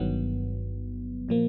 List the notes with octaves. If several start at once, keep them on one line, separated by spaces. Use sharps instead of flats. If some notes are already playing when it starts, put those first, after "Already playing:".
Already playing: G1 G2 D#3 F#3 B3
A#2 F3 A#3